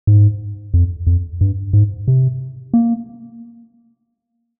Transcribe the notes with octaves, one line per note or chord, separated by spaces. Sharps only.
G#2
F2
F2
G2
G#2
C3
A#3